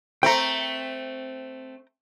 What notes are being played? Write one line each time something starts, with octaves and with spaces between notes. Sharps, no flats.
A3 C4 G5 A#5